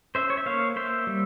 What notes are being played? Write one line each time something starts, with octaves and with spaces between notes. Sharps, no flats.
C#4 C5 E5
C#5
E5
A#3 C#5 F5
A#3 C5 E5
G3